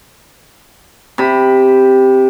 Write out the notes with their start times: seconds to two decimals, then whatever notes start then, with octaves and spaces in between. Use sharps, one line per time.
1.18 C3 B5